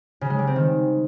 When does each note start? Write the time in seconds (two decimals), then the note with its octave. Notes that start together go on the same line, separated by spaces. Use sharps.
0.21 C#3
0.30 G#3
0.39 G3
0.47 C4
0.56 D#3